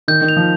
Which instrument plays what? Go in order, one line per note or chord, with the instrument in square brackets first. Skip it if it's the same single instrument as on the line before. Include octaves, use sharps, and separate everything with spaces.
[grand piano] D#3 [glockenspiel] G6
[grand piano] D#3
[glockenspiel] F7
[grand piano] F3